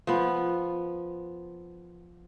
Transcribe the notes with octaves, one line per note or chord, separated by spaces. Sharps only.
F3 B3